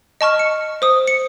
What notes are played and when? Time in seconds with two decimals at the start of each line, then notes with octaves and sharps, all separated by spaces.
0.21 D#5 A5 C#6 F6
0.39 C#7
0.82 C5 D#6
1.07 C#7